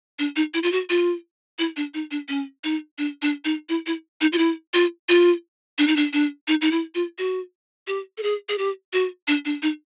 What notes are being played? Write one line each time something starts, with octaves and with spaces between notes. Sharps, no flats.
D4
D#4
E4
F4
F#4
F4
E4
D4
D#4
D4
C#4
D#4
D4
D4
D#4
E4
E4
D#4
F4
E4
F4
F4
D4
D#4
D4
D4
D#4
D#4
E4
F4
F#4
G4
A4
G#4
G#4
G4
F#4
D4
D4
D#4